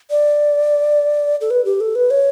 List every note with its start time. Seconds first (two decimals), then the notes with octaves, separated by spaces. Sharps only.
0.11 D5
1.41 A4
1.51 B4
1.65 G4
1.80 A4
1.95 B4
2.11 C#5